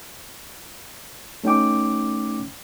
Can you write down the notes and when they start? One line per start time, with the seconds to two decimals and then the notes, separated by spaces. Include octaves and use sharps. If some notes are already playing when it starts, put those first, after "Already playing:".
1.44 A3 C#4 D#4 G5 D6